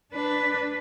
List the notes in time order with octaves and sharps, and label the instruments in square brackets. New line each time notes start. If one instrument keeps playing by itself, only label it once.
[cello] D4 B4